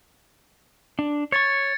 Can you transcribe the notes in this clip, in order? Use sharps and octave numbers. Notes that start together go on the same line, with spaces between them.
D4
C#5 C#6 G#6 A6 C#7